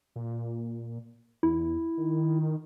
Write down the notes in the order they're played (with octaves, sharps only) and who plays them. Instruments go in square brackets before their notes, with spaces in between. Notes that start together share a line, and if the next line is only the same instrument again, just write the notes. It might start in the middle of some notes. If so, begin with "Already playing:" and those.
[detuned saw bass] A#2
[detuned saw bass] E2 [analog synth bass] E4
[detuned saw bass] D#3